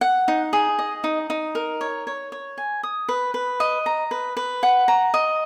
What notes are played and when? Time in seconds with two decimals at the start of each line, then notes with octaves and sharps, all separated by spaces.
0.01 F#5
0.28 D#4
0.53 G#4
0.79 D#5
1.04 D#4
1.30 D#4
1.55 A#4
1.81 C#5
2.07 C#5
2.32 C#5
2.58 G#5
2.83 D#6
3.09 B4
3.34 B4
3.60 D#5
3.86 A#5
4.11 B4
4.37 B4
4.63 F#5
4.88 A#5
5.14 D#5